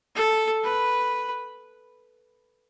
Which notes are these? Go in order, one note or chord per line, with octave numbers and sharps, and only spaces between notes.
A4
B4